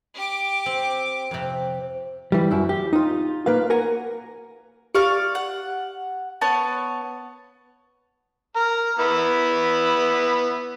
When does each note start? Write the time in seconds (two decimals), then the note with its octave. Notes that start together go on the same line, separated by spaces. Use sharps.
0.15 G4 D6
0.66 C4
1.31 F2 C3
2.32 E3 G3
2.51 F#2 E4
2.69 G4
2.93 D#4 F4
3.46 A#3 B4 F5
3.70 A#4 F#5 G#5 A#5
4.95 G4 D5 F5 C#6
5.35 F#5
6.41 B3 C#5 A5
8.56 A#4
9.00 B3 E4 B5